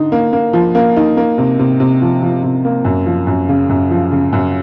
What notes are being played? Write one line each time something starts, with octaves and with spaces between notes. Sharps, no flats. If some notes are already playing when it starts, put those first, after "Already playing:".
Already playing: D3 D#4
A#3
A#3
F3
A#3
D#4
A#3
C3
C3
C3
F3
F3
C3
A#3
F#2
F3
F#2
C#3
F#2
F3
C#3
F#2